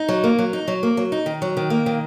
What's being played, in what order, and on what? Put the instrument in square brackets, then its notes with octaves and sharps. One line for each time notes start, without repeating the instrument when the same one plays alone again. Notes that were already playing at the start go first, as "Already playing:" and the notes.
Already playing: [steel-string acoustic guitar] D#4
F#3
A#3
F#3
D#4
F#3
A#3
F#3
D#4
D#3
F#3
D#3
A#3
D#3